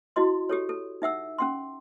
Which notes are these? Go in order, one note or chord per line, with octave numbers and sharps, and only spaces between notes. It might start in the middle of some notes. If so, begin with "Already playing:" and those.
E4 F#4 D#5 C6
G4 A4 C#5
A4
D#4 E5 F#5 E6
C#4 F#5 C6